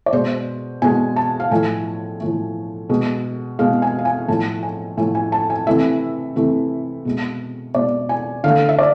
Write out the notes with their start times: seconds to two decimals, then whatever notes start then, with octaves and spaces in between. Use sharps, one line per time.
0.06 D5
0.13 B2 G#3 C5
0.82 B2 G#3 G#5
1.16 A5
1.40 F5
1.51 A2 F3 A3 G#5
2.20 A2 F3 A3
2.89 B2 G#3
3.59 B2 G#3 F5
3.82 G#5
3.99 F5
4.05 G#5
4.28 A2 F3 A3 A5
4.63 G#5
4.97 A2 F3 A3 G#5
5.15 G#5
5.32 A5
5.50 G#5
5.67 C3 E3 A3 E5
6.36 C3 E3 A3
7.05 B2 G#3
7.75 B2 G#3 D5
8.09 G#5
8.44 D3 A3 F5
8.69 E5
8.79 D5